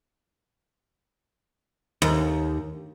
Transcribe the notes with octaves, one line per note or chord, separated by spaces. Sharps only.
D#2